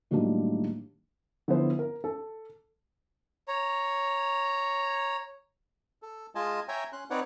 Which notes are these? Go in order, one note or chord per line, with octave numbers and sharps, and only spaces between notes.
A2 D#3 F#3 G3 A#3 D4
D3 F3 B3 E4 C5
A#4
A4
C#5 A#5
A4
G#3 F4 D#5 G#5 A5
C#5 E5 G5 G#5 A#5
C#4 C6 F#6
C4 D#4 B4 C#5 D5 F#5